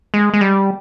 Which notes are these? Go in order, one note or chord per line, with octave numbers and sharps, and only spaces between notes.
G#3
G#3
G3